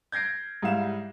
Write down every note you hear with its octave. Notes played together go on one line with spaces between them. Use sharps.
G6 G#6 A#6 C7 D7
G#2 G3 E4 F5 E7